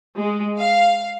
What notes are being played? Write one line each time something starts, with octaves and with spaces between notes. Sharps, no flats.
G#3
F5